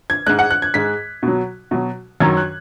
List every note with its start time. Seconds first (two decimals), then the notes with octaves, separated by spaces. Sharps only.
0.10 G#6
0.27 G#2 G#3 F#6
0.39 F#5
0.51 F#6
0.62 G#6
0.74 G#2 G#3 B6
1.23 B2
1.28 F#3
1.71 B2 F#3
2.20 F#2 D#3 F#3 G#6
2.37 F#6